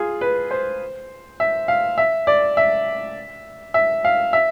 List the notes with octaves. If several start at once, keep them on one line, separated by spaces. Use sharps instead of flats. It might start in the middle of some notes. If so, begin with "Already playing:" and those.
Already playing: F4 G#4
B4
C5
E5
F5
E5
D5
E5
E5
F5
E5